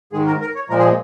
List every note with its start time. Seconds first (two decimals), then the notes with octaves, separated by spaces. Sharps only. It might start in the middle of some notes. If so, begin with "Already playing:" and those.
0.12 G#2 D#3 G#3 G#4
0.26 A#4
0.41 A#4
0.55 C#5
0.69 A#2 F3 G#3 A#4
0.79 G#4